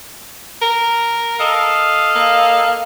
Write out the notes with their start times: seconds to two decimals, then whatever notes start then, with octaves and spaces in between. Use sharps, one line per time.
0.62 A#4
1.40 A4 D#5 F5
2.15 A#3